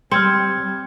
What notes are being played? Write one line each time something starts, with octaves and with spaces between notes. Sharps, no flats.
G3 C4 F6 G#6 C#7